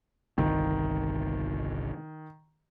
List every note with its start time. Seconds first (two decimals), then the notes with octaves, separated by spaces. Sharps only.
0.38 G1 C2 C3 D#3